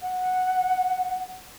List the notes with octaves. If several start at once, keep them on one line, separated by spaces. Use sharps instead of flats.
F#5